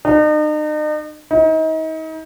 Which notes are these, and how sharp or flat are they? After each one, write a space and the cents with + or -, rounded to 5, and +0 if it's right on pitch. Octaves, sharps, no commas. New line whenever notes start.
D#4 -40
D#4 +35